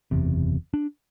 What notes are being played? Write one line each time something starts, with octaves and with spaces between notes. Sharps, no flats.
F#1 E2 C3
D4